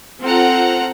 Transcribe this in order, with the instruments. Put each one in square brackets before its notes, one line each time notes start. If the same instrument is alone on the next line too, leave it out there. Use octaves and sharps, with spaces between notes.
[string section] C4 F4 A4 F#5 A#5